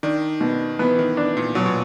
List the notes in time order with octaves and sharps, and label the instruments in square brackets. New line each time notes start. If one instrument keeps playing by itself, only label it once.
[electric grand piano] D#3 [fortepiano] D4
[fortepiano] B2
[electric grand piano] E3 [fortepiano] B3
[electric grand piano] D#3
[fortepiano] D4
[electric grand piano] A#2
[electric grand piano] B2 [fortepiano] F#3
[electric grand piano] A#2